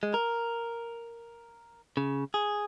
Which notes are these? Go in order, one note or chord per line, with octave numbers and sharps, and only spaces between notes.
G#3
A#4
C#3
G#4